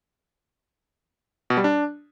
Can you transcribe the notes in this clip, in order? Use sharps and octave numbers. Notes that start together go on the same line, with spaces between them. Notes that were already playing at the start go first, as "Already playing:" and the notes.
B2
G3
D4